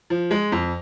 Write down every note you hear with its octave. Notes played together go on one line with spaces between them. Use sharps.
F3
G#3
F2